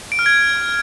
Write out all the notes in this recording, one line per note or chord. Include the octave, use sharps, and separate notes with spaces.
D7
F6
G#6